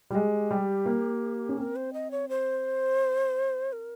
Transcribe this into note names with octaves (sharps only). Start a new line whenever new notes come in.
G3 F4
G#3 G4
G3
A#3
C#4
C4 A#4
C5
D#5
C#5
C5
A#4